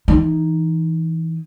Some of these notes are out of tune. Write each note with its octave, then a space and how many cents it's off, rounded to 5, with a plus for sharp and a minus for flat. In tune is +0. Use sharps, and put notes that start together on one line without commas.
E3 -15 D#4 +0